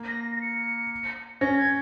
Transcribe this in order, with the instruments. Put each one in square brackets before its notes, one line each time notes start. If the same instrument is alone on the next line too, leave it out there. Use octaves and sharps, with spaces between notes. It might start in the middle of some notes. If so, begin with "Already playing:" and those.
Already playing: [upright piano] A#3
[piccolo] A#6
A#6
A#6
C#7
[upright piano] C#4 [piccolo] A#6
[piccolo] G#6